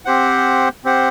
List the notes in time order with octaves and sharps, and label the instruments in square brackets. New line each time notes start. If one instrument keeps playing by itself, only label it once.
[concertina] C4 G4 C5 F#5
C4 G4 C5 F#5